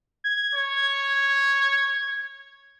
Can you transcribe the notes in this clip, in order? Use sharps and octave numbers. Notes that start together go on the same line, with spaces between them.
G#6
C#5